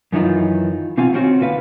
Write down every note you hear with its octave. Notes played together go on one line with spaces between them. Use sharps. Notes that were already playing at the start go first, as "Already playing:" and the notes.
F#2 D#3 E3 D#4 F4
B2 C4 F4 F5 G#5
D#3 C4 C#4 F#4
D2 A#2 B4 F5